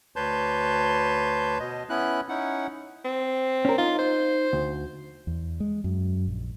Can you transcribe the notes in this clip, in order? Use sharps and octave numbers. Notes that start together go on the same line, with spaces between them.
D2 B4 C#5 A5 C6 G6
B2 D#5
B3 C#4 E4 F#6
C#4 D#4 E4 F#5
C4
C#4 A#4
D#4 F4
C5
D2
E2
G#3
F#2
A#1